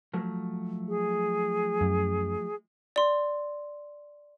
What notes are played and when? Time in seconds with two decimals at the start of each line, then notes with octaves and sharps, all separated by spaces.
0.14 F3 F#3 A3
0.88 G#4
1.81 F#2
2.96 D5 C6